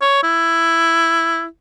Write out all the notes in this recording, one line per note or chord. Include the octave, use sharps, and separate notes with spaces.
C#5
E4